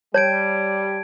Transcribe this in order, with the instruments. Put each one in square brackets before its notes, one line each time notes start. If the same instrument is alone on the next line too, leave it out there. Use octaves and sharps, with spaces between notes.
[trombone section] G3 [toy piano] C#5 [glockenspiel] A5 G#6 D7